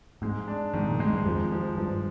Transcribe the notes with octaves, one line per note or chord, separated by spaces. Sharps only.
G#2 G#3
D4
G#2 D#3
A#2
G#2 G#3
G2
F2 F3
F3
G2 F3